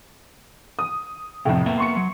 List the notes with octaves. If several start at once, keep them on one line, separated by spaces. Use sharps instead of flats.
D#6
F2 A2 C3 F3
A#3 B3 E5
C6 C#6 C#7
F#3